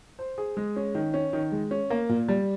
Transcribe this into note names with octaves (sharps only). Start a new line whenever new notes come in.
C5
G#4
G#3
C#4
D#3
C#4
D#3
G#3
C#4
A#3
A#2
G3